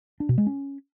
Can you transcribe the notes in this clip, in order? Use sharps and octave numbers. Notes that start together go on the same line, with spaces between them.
D4
B2
G#3
C#4